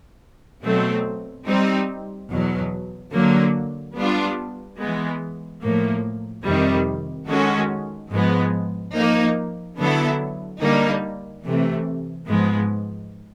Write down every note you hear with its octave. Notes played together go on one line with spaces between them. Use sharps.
B2 F#3 A3 C4
G3 C4 D#4
E2 B2 F#3
D3 F#3 A#3
G3 B3 D4 F4
E3 G#3 B3
A2 F3 A#3
F2 C3 D#3 G3
D#3 G#3 C#4 F#4 A4
G#2 F3 G#3 B3
F3 A#3 D#4
D3 F#3 B3 E4 A4
D3 G3 A#3 D#4
C3 E3 A3
G#2 F3 G#3 B3